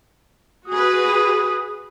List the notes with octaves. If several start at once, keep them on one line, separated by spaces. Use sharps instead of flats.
F#4 G#4 B4 D#6